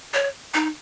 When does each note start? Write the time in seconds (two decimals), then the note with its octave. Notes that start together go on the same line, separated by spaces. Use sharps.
0.14 C#5
0.54 D#4